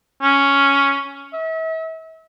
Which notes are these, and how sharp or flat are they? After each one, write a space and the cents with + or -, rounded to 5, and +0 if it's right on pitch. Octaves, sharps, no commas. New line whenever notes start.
C#4 +5
E5 -40